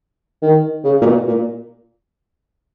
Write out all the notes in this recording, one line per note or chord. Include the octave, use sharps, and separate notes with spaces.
D#3
C#3
A#2
B2
A#2